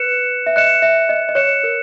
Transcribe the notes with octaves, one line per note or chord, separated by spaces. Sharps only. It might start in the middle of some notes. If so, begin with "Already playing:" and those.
Already playing: B4 F#6 C#7 E7
E5
D#5 F#6 C#7 E7
E5
D#5
D#5
C#5 F#6 C#7 E7
A#4